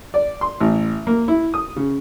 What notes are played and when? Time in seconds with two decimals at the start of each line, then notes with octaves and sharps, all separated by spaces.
0.14 D5
0.41 C6
0.60 A1
1.07 A#3
1.28 E4
1.54 D#6
1.76 C#3